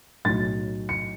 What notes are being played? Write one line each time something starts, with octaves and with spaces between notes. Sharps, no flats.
B1 A2 F#3 A6
C#7